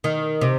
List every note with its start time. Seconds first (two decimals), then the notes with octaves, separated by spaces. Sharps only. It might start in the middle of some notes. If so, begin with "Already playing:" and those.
0.04 D#3
0.41 C3